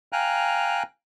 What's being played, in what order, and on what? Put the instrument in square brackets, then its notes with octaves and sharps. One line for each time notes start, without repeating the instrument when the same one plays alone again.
[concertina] F5 G5 G#5 A#5 F#6